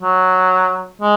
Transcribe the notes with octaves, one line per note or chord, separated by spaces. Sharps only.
F#3
G#3